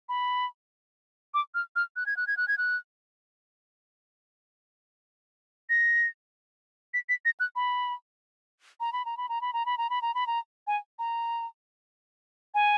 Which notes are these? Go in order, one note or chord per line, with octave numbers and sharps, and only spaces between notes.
B5
D6
F6
F6
F#6
G#6
F#6
G#6
F#6
G#6
F#6
A#6
B6
B6
A#6
F#6
B5
A#5
B5
A#5
B5
A#5
B5
A#5
B5
A#5
B5
A#5
B5
A#5
G#5
A#5
G#5